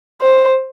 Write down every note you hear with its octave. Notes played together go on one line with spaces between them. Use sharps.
C5